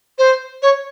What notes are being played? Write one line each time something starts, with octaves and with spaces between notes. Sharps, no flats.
C5
C#5